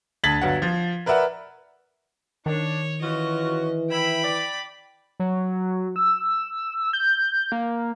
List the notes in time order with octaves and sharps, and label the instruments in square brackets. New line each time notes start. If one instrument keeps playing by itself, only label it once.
[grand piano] D2 A5 G#6 A6 B6 F#7
G1 F#3 F#5
F3
A#4 B4 D5 E5 F#5
[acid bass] D#3 [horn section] D4 [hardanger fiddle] C#5
[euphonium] E3 [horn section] C#4 F4 F#4 [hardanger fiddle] D#5
[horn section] E4 [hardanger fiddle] G5 B5
[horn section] D5
[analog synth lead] F#3
E6
G6
A#3